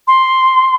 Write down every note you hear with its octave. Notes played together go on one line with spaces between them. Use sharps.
C6